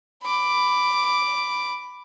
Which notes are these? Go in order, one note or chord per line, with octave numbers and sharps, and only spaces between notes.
B5 D6